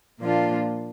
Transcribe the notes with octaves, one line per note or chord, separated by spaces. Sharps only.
A#2 F3 A#3 D4 F4